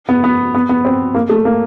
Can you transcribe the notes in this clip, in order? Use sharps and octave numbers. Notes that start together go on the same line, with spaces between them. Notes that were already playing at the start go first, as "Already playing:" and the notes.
B3
B3
B3
B3
C4
A#3
A3
A#3